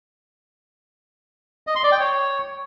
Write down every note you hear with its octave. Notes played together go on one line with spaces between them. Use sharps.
D#5
C6
D5
G5
C#5